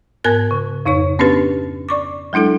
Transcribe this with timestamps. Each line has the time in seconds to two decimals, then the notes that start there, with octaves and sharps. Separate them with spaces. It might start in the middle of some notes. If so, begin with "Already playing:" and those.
0.24 G#2 B3 A#4 F#6 G#6
0.51 C#3
0.86 F2 C#3 D#4 C#5
1.19 B3 C#4 D4 G4 B4
1.89 D5 C#6 D6
2.33 F#3 G#3 D4 E4 A4